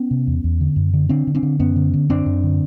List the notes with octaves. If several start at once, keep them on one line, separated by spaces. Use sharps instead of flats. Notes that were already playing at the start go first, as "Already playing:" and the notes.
Already playing: B3 C#4
C3
E2
E2
D3
F#2
D3
D3 C4 D4
D3
C4 D4
D3
F#2 B3 C#4
D3
D3
F#2 C4 D4
F#2
D3